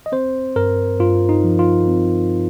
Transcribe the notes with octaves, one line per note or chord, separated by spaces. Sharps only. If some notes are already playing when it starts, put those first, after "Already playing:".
D#5
C4 C5
G2 A#4
G2 F4
D#4
F3
F4
C4